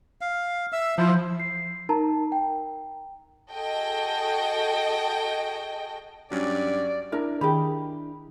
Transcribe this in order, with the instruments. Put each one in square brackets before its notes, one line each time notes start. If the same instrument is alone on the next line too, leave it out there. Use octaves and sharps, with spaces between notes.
[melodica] F5
E5 E6
[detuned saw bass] F3 [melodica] E4 C5
[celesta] C7
D#4 A#4 A5 A#5
G5
[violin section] F#4 G#4 A4 D#5 G5
[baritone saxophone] G2 [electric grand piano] F#3 C#4 [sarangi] D5
[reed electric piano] D4 E4 [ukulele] A#4 A#5
[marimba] D#3 [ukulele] G4 G#4 B5